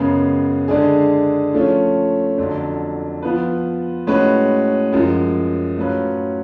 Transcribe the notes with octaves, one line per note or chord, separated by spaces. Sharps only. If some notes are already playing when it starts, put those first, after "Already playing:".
Already playing: F#2 C#3 G#3 B3
D3 G#3 D4 G#4
F3 A3 C#4 F4
F2 D3 F#3
F3 B3 F4 B4
A2 G#3 C#4 F#4 B4
F#2 F3 G#3
A2 F#3 C#4 F4 B4